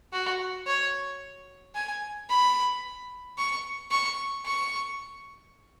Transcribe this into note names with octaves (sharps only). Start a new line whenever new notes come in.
F#4
C#5
G#5
B5
C#6
C#6
C#6